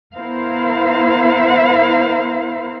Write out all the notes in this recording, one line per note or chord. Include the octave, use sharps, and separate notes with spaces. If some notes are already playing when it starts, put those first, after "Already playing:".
B3 E4 A#4 C5 F5